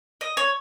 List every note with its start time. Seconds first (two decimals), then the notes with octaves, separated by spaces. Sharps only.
0.21 D#5
0.37 C#5